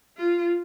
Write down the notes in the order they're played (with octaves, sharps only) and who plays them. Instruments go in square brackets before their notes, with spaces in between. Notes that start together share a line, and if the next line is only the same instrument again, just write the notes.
[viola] F4